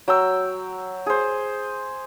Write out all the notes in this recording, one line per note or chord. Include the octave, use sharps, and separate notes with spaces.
F#3 G5 E6
G#4 C5